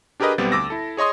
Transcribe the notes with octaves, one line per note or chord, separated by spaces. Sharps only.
D4 G4 G#4 A#4 B4 D#5
B1 G3 B3 C4 G4 A6
D2 D6 E6 A#6
E4 A4
G#4 C#5 D#5 C6 D#6